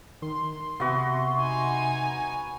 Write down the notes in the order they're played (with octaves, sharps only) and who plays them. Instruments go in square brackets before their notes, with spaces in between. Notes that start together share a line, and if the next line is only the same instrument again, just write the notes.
[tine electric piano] D#3 [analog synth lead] C6
[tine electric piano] C3 E5 [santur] B3 F#4
[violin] D#4 G#5